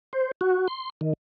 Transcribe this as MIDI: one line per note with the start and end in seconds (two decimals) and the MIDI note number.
0.13 0.31 72
0.41 0.68 66
0.68 0.90 84
1.01 1.13 51